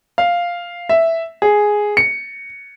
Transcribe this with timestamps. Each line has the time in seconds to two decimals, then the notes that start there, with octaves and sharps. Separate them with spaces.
0.18 F5
0.89 E5
1.42 G#4
1.97 C#7